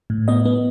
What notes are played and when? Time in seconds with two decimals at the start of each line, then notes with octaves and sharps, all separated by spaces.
0.10 A2
0.28 B3 D#5
0.45 B3